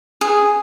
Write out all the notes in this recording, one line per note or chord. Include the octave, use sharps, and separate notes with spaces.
G#4